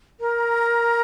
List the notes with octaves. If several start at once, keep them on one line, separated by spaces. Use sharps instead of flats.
A#4 A#5